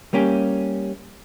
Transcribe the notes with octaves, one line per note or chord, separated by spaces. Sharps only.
G3 A#3 C#4 G4